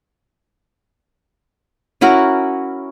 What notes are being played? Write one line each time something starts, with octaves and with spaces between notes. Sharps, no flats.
C#4 E4 F#4 A#4